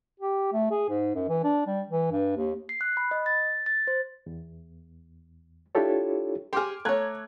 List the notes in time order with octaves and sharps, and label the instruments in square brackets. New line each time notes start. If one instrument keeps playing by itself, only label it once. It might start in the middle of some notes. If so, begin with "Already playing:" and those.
[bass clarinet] G4
A3
G#4
G#2
F#2
E3
D4
G3
E3
G2
D#2
[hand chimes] C7
F#6
B5
D#5
A6
A6
C5
[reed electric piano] E2
D4 E4 F4 G4 A4 C#5
[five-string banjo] G4 G#4 [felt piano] C6 D6 F6
[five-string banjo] A3 C#5 [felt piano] A#5 F#6 G#6